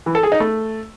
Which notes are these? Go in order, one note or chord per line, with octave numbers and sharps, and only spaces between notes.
E3
A4
G#4
D#4
A3